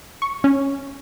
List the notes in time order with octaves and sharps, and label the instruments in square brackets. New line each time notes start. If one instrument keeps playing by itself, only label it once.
[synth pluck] C#6
C#4